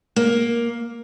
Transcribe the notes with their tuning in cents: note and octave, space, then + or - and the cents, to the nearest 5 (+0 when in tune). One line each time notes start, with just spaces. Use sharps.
A#3 +10